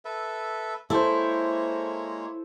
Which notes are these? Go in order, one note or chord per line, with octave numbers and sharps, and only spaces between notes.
A4 B4 E5
G#3 A#3 E4 A4 C5 C#5